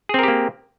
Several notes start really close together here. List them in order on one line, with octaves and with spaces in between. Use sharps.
G#4 C4 A#4 G4 A#3